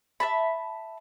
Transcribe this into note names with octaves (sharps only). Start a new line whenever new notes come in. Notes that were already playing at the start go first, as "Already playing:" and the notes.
E5 A5 B5